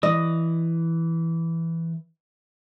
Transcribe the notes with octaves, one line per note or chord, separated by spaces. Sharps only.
E3 D#5